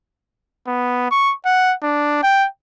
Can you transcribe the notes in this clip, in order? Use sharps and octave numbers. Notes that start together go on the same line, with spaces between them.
B3
C#6
F#5
D4
G5